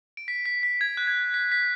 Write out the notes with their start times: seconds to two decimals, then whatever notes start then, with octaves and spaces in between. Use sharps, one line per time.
0.17 D7
0.28 B6
0.46 B6
0.63 B6
0.81 G#6
0.97 F#6
1.07 G#6
1.34 B6
1.52 B6